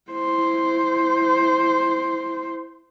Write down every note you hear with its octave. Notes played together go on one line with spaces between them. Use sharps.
E4 C5